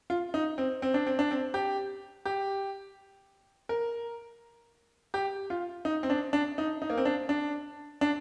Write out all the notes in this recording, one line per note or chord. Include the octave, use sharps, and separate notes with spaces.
F4
D#4
C4
C4
D4
C4
D4
C4
G4
G4
A#4
G4
F4
D#4
C4
D4
D4
D#4
D#4
A#3
C4
D4
D4
D4